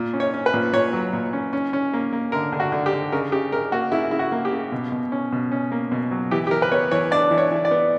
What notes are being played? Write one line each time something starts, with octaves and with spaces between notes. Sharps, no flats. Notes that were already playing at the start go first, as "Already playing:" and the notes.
Already playing: A#2
C#4
C#5
C#4
B4
A#2
A#2 C#5
F#3
A#2
C#4
C#4
C#4
A#3
A#3
D3 A#4
D3
F#4
D3
G4
D3
C#3 A#4
C#3 G4
C#3 A#4
A#3 F#4
C#3 E4
C#3 E4
F#4
A#3
G4
C#3
B2
B2
C#4
B2
C#4
A#3
B2
F#3
E3 G4
G4
E3 A#4
B4
B3 C#5
E3 C#5
D4 D5
E3
C#5
E3
D5
B3